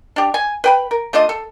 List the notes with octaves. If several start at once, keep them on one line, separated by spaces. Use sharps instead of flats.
D4 G4
G#5
B4 G5 B5
A#4
A3 D4 F4 D#5
A4